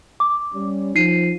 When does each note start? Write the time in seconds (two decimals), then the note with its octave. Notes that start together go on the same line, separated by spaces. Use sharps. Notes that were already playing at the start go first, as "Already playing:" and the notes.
0.20 D6
0.54 G3 C#4
0.95 F3 D#4 C7 D#7